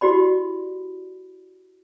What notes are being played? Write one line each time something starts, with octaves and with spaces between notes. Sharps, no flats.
E4 F#4 G4 D5 B5